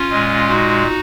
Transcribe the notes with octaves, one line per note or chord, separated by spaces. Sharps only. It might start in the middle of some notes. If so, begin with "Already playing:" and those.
Already playing: C#4 F4
A#2 G#3
D#4 F#4